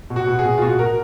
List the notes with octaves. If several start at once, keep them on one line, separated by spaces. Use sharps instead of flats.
B2
F#4
B2
G#4
B2
F4
B2 F#4
B2 A#4